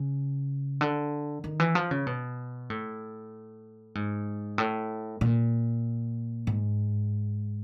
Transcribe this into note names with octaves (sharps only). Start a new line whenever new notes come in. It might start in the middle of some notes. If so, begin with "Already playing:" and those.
Already playing: C#3
D3
D#3
E3
F3
C#3
B2
A2
G#2
A2
A#2
G#2